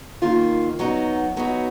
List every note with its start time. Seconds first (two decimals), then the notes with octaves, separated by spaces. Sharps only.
0.22 D#3 A#3 F4
0.79 F#3 B3 D#4 F#4
1.37 F#3 B3 D#4 F#4